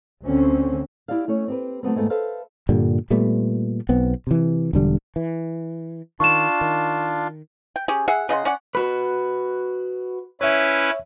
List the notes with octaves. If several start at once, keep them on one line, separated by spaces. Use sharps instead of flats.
D2 D3 C4 C#4
E4 G4 D5 E5 F5
A3 C#4 C#5
C4 G4 B4
F#3 A3 B3 C4
D#2 G#2 A3 B3
A4 B4 C5 E5 F5
G2 A#2 D3 G3
A#2 G3 A3 B3
B1 B3 C4
C3 E3
E1 D3 G3
E3
D#3 D4 F4 C#6 E7
D#3
G5
C#4 G4 G#4
G#4 E5 F#5
C#3 D#5 F#5 C6
C#4 D5 F#5
F#4 B4
C#4 E4 B4 C#5 E5